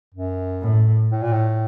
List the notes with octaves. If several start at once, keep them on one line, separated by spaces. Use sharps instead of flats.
F#2
A2
A2
A#2
A2